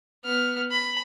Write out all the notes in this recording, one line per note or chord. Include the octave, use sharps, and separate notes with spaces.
B3 F6
B5